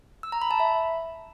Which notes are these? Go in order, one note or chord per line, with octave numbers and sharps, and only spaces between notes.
E6
A#5
B5
A5
E5